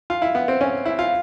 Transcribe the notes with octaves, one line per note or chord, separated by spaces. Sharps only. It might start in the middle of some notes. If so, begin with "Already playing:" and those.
F4
E4
B3
C4
C#4
E4
F4